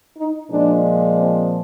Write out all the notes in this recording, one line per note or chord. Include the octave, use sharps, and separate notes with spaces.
D#4
A#2 F3 G#3 D4
C4